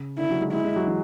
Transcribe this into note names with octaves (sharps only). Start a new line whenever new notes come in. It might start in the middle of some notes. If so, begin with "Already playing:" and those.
Already playing: C#3
D3 E4
F#3
G#3
G#3 E4
G#3
F#3
E3